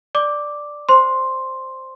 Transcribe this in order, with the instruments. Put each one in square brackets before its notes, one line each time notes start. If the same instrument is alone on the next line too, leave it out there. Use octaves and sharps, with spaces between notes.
[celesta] D5 D6
C5 C6